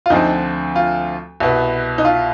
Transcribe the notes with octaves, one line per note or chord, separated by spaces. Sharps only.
F4
D2 D3 F3 C4 D#4
F4
C2 B2 B3
D#4
F4